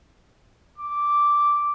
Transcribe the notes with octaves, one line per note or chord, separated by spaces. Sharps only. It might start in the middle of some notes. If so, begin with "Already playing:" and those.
D6